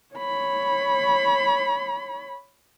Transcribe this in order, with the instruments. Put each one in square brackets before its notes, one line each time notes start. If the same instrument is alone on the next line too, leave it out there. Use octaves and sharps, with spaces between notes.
[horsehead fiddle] C#5 B5